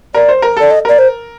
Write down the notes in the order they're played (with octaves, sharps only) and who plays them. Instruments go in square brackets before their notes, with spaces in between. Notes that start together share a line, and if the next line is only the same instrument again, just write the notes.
[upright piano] A#4 [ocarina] D5
[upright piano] C5
A#4
[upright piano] A4 [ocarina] D5
[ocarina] D#5
[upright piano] A#4 [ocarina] D5
[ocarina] C5